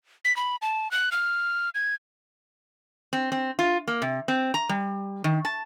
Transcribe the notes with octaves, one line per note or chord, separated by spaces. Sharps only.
B6
B5
A5
F#6
F6
G#6
C4
C4
F4
A#3
C3
C4
A#5
G3
D#3
A5